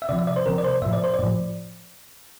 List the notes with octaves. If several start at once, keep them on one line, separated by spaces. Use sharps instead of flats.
E5
C3 F3 D5
E5
D5
C5
C3 F3 A#4
D5
C5
A2 F3 E5
D5
C5
D5
A2 F3